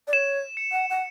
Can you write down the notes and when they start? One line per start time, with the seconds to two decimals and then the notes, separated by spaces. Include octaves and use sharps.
0.07 D5
0.13 C#5 E7
0.57 C#7
0.72 F#5
0.90 F#5